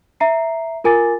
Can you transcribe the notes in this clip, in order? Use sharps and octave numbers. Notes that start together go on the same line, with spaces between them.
E5 A#5 C7
F4 A#4 G#5 D6 A6